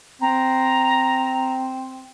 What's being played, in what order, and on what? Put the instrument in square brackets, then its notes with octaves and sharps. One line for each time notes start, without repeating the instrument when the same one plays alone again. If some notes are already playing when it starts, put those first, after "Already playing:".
[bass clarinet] C4 [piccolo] A#5